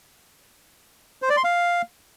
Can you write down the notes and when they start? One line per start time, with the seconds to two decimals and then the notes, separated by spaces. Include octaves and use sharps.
1.22 C5
1.29 D5
1.37 C6
1.44 F5